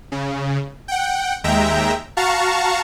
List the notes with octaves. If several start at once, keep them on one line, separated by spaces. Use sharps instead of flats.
C#3
F#5 G5
D#2 G#3 E5 G5 A#5
F#4 F5 A5 A#5 C#6